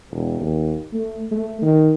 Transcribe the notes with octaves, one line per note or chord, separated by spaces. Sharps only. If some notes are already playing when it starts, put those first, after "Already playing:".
E1
D#2
A3
A3
D#3